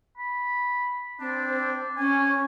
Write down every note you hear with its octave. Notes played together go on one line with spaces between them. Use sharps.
B5
C4 D4
C#4 G#5